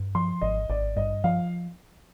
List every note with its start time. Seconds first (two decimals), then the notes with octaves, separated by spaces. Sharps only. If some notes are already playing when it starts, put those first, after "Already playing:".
Already playing: G2
0.15 F3 C6
0.41 G#1 D#5
0.69 G#1 D5
0.96 G2 D#5
1.24 F3 F5